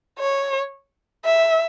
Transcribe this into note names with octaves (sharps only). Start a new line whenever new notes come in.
C#5
E5